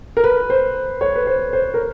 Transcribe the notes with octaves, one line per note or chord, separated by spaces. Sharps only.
A#4
B4
C5
C#5
B4
C5
C5
A#4